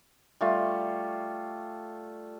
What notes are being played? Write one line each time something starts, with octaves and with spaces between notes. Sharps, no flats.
G3 A3 F4